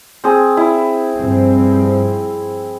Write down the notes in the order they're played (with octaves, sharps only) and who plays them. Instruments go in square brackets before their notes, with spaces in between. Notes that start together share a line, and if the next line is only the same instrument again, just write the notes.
[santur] C4 G#4
E4
[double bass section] G2 F3 C4